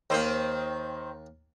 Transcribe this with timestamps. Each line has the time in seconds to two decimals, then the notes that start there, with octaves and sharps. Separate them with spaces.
0.10 D#2 D#3 A#3 C4 C5